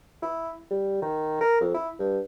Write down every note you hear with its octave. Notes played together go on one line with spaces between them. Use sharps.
E4
G3
D#3
A#4
F2
E4
G2